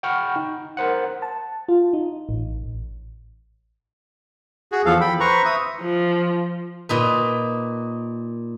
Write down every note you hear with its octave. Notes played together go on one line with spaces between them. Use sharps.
F#5 G5 B5 C#6 F6
D#4
A#4 C5 F#5
A5
F4
D#4
A1
F#4 G#4
E2 F3 A4 F5
G5 B5
B4 C5 A#5 C#6
E5 D#6
F3
A#2 D#4 B4